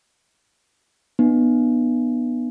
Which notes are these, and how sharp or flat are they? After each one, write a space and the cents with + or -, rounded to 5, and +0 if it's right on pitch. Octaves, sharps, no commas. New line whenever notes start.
B3 -10 D#4 -45